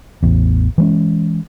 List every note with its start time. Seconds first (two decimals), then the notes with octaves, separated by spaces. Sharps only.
0.23 A1 E2
0.78 E3 G#3 C#4